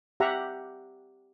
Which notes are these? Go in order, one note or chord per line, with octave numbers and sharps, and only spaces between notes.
G4 E5 F#5 A#5